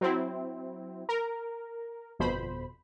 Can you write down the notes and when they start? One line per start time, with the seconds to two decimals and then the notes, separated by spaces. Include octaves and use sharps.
0.01 F#3 C4 E4
1.09 A#4
2.19 G1 F2 B2 C5 B5